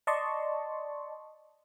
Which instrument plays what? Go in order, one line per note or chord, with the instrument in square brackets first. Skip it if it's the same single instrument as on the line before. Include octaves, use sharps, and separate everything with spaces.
[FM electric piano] D5 D#5 A5 C6 C#6